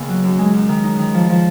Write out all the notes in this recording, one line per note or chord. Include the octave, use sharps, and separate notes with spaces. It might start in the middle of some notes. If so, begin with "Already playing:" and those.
Already playing: D#2 C#3 B3
F#3
F#2
G#3
F#2
D#3
D#4
D#3
F3
F3